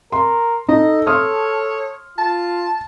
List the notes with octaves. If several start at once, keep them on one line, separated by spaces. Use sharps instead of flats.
A#4 C6
D#4 A4 D#5
C#5 C6 D#6 F6
F4 A5